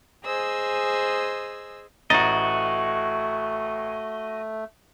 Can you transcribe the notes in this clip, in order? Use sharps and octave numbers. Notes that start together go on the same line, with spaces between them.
G#4 C5 D#5 G#5 E6
A1 A3 F#4 D#5 A#5 A6